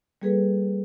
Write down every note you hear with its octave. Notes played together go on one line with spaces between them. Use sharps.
G3 A#3 G#4 A4 B4